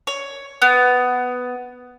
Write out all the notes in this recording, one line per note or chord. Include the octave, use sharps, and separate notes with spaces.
C#5
B3